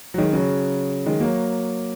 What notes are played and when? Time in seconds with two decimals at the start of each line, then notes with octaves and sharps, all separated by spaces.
0.14 F#3
0.18 D#3 G#3
0.33 C#3 F#3
1.06 D#3 G#3
1.20 F#3 A#3